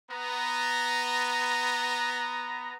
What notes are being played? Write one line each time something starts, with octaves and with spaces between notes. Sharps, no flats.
B3 A#5